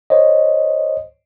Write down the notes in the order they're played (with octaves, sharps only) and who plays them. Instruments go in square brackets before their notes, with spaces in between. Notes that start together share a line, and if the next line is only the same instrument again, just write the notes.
[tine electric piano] C5 C#5 D#5